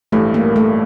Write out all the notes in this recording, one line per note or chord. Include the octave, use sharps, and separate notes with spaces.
A1 G2 E3 G3 A3
A#3
A3